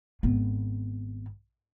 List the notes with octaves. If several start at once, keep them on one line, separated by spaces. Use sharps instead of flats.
G#1 B3